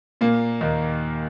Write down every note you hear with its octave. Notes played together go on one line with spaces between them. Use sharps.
A#2 A#3
D#2 D#3